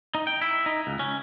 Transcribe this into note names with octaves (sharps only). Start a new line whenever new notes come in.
D#4
G5
E4
D#4
C#2
C#4